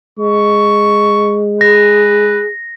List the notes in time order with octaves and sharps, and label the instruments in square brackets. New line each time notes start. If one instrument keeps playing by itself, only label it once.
[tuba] G#3 [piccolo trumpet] C#6
[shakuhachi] G#4 [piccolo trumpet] B4 [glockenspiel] A#6